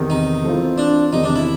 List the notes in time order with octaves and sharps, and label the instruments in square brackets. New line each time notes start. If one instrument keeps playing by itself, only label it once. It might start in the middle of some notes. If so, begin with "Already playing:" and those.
Already playing: [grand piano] E2 C3 D#3
[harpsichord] D#4
[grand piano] E3 A3 C4 F4
[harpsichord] D4
[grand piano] E2 C3 D#3 [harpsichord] D#4
[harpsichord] D4
E4